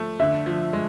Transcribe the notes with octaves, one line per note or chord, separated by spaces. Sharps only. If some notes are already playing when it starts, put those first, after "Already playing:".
Already playing: F3 A3
D3 E5
F3
G#3